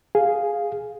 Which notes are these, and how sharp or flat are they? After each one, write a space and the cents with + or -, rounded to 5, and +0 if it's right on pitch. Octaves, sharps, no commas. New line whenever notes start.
G#4 +0 F5 +0